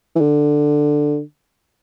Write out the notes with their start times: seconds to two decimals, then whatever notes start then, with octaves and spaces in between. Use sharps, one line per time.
0.16 E3
0.21 D3